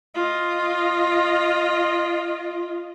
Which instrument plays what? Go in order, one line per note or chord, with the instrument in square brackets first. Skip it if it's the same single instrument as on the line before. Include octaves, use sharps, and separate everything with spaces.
[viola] F4 D#5